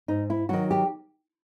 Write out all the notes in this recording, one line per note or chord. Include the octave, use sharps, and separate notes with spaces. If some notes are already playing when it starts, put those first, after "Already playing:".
G#2 D#4
E4
D#3 F#3 F#4
G4